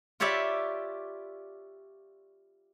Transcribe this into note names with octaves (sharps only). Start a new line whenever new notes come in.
F4 G4 C#5 D5 E5 B5